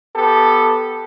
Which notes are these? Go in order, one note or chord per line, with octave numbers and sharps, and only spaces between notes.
B3 G4 A4